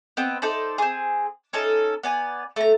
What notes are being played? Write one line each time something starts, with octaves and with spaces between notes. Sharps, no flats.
B3 C4 B4 D#5
D#4 A4 C5 D5
C4 G#4
C#4 D#4 A4
B3 D5 G#5
A3 A#5